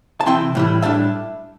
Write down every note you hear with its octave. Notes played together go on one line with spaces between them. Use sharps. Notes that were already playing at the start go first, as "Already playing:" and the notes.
A5
C3 E3 C4 E4 G5 C6
A2 E3 G3 E4
A2 G3 D4 E5 A5